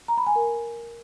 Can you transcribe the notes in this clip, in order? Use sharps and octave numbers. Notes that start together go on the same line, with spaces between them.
A#5
B5
G#5
A#4